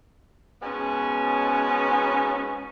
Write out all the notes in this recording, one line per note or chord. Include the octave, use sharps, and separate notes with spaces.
G#2 B2 B3 C#4